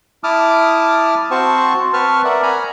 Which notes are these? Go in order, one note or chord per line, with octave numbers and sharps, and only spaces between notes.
E4 A5 D6 D#6 F6
C4 F#4 C5 A5 C#6
C4 B4 A5 C#6 F6
A#4 D5 E5 F#5
G#5 A#5 B5